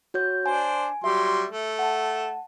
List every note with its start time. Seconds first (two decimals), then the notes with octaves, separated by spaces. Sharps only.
0.14 F#4 C#5 G6
0.46 D4 C5 G#5
1.04 F#3 G3 E5 C6
1.50 A3
1.79 F#5 A5